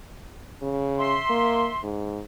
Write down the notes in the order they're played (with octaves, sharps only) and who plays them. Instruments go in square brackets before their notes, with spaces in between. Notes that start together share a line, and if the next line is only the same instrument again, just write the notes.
[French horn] C#3
[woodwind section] E5 C6
[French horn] A#3
G#2